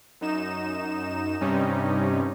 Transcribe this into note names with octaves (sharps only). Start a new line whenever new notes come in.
F#2 D#4 E7
G2 C3 G3 C#4 D#4